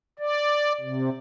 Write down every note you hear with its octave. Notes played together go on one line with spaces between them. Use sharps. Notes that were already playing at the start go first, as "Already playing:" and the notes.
D5
C3